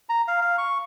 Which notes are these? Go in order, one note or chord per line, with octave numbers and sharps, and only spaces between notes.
A#5
F5
F5
C#6